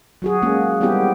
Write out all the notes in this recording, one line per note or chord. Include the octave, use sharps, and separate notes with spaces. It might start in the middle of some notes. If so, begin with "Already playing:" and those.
F#3 F#4 G#4
G#3 A#3 C#4
G3 B3 C4 E4 G4